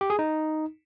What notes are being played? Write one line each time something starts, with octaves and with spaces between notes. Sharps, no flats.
G4
G#4
D#4